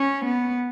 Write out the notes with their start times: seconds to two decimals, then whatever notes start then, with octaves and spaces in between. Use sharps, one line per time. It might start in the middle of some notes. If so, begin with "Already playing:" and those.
Already playing: C#4
0.25 B3